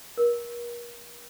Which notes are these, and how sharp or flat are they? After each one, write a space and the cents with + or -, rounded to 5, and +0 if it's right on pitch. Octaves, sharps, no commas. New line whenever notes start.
A#4 +35